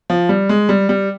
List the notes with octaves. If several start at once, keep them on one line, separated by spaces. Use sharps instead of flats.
F3
G3
G#3
G3
G3